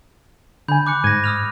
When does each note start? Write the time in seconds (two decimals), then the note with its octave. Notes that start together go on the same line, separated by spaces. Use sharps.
0.68 D3 G#5 B5 G6
0.87 D6 F#6 C#7
1.04 G#2 G#6 A#6 D#7
1.24 D#6 F6 F7